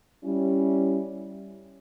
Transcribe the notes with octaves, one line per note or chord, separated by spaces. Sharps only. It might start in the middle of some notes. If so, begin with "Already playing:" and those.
G3 C#4 E4